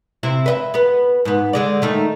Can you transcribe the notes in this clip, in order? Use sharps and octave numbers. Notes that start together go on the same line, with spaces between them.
C3 C4 E4
B4 D#5 E5
B3 B4
G#2 B3
D3 G#3 D5
D#3 A3 D#4